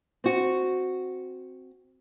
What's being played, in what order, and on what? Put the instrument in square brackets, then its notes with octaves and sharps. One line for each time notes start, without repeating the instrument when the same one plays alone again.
[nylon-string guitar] C4 F#4